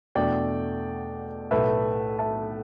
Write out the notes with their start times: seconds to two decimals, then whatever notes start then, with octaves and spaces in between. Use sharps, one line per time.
0.15 E2 B2 A3 D4 D5 G5
1.51 B1 A2 A3 B4 E5
2.19 E5 A5